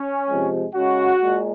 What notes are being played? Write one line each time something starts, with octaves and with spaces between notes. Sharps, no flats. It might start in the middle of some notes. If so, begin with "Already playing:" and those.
Already playing: C#4
C3 F3 G#3
C#3 G#3 F#4
A#2 G#3